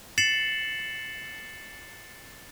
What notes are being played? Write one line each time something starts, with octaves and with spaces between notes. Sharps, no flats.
A6 C7 C#7 E7 F#7